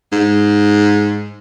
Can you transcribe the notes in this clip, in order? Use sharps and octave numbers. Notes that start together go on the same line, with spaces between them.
G#2